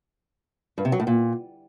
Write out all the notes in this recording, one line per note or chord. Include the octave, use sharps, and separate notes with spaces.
G2
C3
F#3
A2
A#2